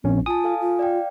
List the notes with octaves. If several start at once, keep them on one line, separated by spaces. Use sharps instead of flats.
A#1 C4 C#4
F4 G#5 A5 D#6
A4 F5 G#5
F4
D5 F5 G5